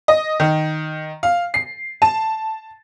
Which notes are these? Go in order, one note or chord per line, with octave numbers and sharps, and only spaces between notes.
D#5
D#3
F5
C7
A5